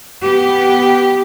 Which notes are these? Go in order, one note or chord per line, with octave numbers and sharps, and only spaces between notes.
B3 G4